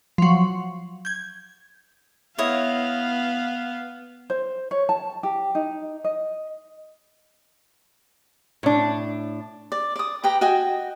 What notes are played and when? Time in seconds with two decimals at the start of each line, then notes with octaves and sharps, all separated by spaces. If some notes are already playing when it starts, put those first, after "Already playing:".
0.18 F3 F#3
1.05 G6 G#6
2.38 B3 E4 C#5 D#5 F5
4.30 C5
4.71 C#5
4.89 A5
5.23 G4
5.55 D#4
6.04 D#5
8.63 A2 D4
9.72 D5
9.96 D5 D#6
10.24 G4 B4 G5 A#5
10.41 F#4 D#5 G5 G#5